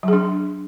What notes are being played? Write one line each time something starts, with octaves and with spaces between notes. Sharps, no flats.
F#3 D4 G#4